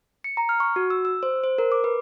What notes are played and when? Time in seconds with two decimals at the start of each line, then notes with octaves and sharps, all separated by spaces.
0.24 C#7
0.37 A#5
0.49 F6
0.60 C#6
0.76 F#4
0.90 E6
1.05 E6
1.23 C5
1.44 C5
1.58 A#4
1.72 D6
1.84 B4